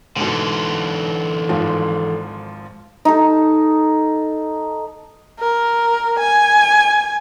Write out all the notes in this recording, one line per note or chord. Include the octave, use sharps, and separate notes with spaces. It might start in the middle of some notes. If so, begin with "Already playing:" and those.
G#2 B2 D3 E3
G#1 G#2 F3
D#4 A4
A#4
G#5